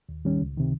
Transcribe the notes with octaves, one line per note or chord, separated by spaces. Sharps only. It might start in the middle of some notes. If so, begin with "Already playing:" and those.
D#2
D#3 G3 C#4
C#2
C3 D#3